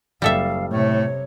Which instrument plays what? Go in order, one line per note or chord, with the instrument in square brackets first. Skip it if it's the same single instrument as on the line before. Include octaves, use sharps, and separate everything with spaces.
[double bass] F#1 [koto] G3 A4 E5 [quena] F5
[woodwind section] A2 A3 [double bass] C3 [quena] C#5